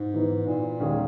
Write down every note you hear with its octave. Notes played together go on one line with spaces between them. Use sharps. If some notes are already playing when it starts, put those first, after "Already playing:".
Already playing: G#2
E3 B3 D#4
A#2
D#2 D#3 G#3 C#4 G#4